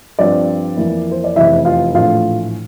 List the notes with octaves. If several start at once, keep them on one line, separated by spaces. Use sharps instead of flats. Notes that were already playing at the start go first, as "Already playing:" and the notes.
G2 F3 C4 F4 D5
F2 E3 A#3 E4
C5
D5
F1 E2 E3 E4 E5
F4 F5
A#1 A2 E3 A3 F4 F5